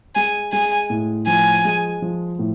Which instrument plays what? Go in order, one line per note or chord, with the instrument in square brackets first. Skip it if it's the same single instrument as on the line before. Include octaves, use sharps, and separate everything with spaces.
[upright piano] G#3 [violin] G#5
[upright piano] G#3 [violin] G#5
[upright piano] A2
[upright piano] F3 [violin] G#5
[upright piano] G#3
F3
A2